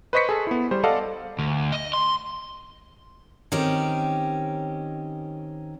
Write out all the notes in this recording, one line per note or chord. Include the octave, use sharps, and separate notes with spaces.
B4 C5 D#5 C#6 B6 C#7
G#4 A4
B3 E4
G3 C5
A4 D5 D#5 F5 F#5 A5
D2
D#5
C6
D#3 C4 C#4 G4